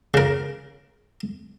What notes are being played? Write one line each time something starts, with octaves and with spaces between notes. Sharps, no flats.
C#3 A#4